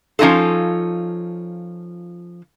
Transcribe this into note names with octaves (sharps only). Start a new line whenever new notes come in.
F3 C#4 D#4 F4 A4